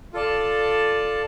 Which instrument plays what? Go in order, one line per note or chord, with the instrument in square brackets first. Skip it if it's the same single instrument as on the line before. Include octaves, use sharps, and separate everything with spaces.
[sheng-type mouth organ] F4 A4 D5 A5